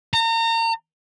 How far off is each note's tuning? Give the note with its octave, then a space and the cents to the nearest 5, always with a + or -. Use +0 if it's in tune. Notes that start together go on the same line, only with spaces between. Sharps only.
A#5 -35